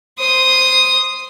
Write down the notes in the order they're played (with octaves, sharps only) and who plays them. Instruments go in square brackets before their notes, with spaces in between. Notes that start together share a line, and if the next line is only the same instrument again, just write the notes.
[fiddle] C5 D#6